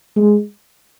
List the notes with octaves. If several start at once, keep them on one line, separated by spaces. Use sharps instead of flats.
G#3